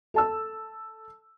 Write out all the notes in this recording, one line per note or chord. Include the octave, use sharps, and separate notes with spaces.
A4 A5 E6